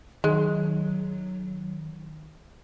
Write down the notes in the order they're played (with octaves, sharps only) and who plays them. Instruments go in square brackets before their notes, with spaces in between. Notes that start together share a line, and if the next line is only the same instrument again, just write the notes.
[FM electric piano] D#3 [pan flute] F#3 [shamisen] G#3